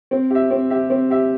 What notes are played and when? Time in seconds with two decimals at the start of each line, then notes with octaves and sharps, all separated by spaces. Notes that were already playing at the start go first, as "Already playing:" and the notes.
0.11 C4
0.30 G4 E5
0.50 C4
0.70 G4 E5
0.90 C4
1.10 G4 E5